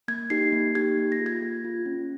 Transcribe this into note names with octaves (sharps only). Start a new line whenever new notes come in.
A#3 G#6
D#4 G4 C7
A#3
D#4 G4 G#6
A#3
A#6
F4 G#4
G#6
A#3
F4 G#4
C#4